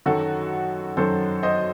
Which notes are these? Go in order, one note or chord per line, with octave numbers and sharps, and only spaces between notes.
F#2 D#3 F#3 F#4 A4
F#2 D#3 F#3 A4 C5
C5 D#5